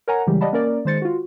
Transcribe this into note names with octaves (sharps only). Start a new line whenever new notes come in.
A#4 C#5 F#5 G#5 A#5
C#3 E3 G3 G#3 G4
G4 D5 D#5 F#5 A5 B5
A#3 C#4 A#4 D5
D#3 G#3 C5 A6 C#7
F4 F#4